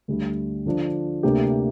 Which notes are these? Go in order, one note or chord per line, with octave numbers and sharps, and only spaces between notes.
D2 D3 G3
D3 F3 D4 F4
D2 C3 A#3 D4 G4